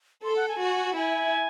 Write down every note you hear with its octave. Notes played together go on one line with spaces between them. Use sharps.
A4 C6
F#5
G#5
F#4
E4 G#5